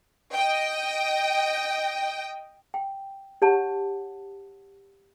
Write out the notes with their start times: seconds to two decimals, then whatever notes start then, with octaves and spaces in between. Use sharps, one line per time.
0.34 D#5 G5
2.74 G5
3.42 G4 C#5 F#5 A5